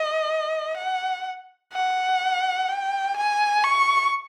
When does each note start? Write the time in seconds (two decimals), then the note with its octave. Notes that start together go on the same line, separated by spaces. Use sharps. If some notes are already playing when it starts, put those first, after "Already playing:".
Already playing: D#5
0.77 F#5
1.73 F#5
2.69 G5
3.16 G#5
3.64 C#6